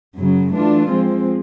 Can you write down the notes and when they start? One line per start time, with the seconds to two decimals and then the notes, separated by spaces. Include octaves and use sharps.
0.17 F#2 C#3 F#3
0.53 E3 A3 D4 F4
0.91 F3 G#3 C4